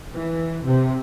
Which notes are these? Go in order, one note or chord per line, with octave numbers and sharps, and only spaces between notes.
E3
C3